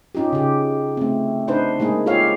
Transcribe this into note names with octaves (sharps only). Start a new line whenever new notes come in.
C#4 D#4 F4 G4
C#3 G4
A3 C4
D4 D#4 B4 C5
G#3 A#3 D#4 G#4
F4 G4 A4 C#5 F5